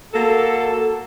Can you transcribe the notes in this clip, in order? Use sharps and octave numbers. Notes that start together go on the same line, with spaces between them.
A#3 F#4 A4